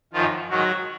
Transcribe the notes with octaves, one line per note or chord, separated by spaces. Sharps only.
F#2 D#3 F3 F4
G#2 D#3 F#3 F#4